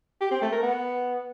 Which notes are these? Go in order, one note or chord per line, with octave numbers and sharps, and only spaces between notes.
G4
C4
A3
A#4
B3